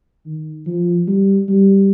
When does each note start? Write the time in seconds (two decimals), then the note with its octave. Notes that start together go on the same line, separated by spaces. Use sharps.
0.26 D#3
0.67 F3
1.08 G3
1.49 G3